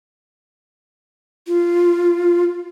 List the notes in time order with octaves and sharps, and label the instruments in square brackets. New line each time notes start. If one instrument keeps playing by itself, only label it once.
[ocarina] F4